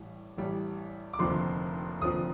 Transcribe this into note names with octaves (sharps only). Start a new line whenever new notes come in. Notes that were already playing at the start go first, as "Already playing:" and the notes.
Already playing: A1 A2 G3
A1 A2 G3
D6
F1 D#2 D3 F3 C4 C6
F1 D#2 D3 F3 C4 D#6